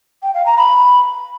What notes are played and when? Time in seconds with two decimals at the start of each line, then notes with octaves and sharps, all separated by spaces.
0.23 G5
0.34 F5
0.46 A#5
0.57 B5